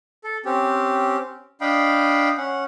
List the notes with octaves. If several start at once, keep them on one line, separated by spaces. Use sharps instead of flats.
A4
C4 C#4 G4
D4 D#5 F5 G5 B5
C#4 F#5